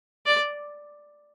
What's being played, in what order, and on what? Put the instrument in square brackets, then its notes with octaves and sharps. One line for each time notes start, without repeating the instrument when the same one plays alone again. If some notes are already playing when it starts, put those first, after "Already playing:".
[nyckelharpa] D5